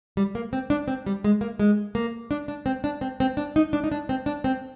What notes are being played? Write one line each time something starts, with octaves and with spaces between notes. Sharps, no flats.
G3
A#3
C4
D4
C4
G3
G#3
A#3
G#3
A#3
D4
D4
C4
D4
C4
C4
D4
D#4
D4
D#4
D4
C4
D4
C4